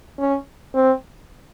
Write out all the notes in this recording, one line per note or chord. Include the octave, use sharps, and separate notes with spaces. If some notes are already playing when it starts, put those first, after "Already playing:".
C#4
C4